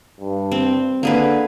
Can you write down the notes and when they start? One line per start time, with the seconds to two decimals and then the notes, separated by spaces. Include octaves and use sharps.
0.21 G2
0.52 C4
1.03 D3 A#3 G#4 B4